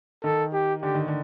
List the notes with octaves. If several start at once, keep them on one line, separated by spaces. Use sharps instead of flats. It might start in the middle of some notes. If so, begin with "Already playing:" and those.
D#3 A4
G4
D3 G4
D#3
D3